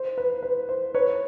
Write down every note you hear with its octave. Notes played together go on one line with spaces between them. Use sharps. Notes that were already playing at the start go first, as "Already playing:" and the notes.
Already playing: C5
B4
B4
C5
B4 C#5